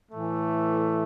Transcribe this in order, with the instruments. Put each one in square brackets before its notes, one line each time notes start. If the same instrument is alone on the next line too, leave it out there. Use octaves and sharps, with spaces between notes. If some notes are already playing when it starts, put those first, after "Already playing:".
[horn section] A2 E3 A3